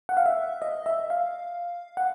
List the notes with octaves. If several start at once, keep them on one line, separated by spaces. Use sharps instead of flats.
F#5
F5
E5
D#5
E5
F5
F#5